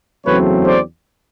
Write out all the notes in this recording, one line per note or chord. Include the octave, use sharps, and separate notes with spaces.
E2 C#3 F#3 A3 C4 B4 C#5
C5 D5